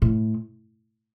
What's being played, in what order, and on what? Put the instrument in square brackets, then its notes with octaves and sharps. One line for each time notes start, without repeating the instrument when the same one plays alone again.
[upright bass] A2